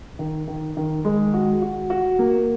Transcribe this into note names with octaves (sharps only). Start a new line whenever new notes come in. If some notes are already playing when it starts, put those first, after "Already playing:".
D#3
D#3
D#3
G#3
F#4
F#4
F#4
A#3